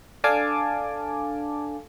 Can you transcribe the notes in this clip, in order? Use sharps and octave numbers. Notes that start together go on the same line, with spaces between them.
D4 A4 F5 G#5 A5 D6